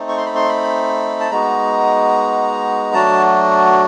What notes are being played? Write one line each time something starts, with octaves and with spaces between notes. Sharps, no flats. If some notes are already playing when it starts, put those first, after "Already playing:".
Already playing: A3 C4 D#4
C#6
C6
B5
C6
B5
A5
G#3 B3 D#4 F#4 A#5
F#3 A3 D4 F#4 A5